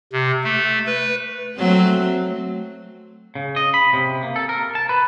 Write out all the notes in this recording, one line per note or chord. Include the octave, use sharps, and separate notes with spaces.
C3
A3
B4
F#3 A3 C4
C#3
D#5
B5
C3
A#3
A4
A#4
A5
B4